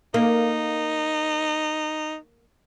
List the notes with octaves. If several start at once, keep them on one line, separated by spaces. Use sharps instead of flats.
A#3 D#4